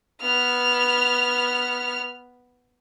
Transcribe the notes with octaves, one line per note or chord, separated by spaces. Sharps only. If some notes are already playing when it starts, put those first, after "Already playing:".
B3 F6